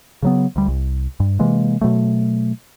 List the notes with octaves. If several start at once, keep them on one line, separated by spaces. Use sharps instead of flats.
C#3 F#3 B3
D2 G3
C2
G2
C3 E3 G#3 A#3
B2 F#3 A3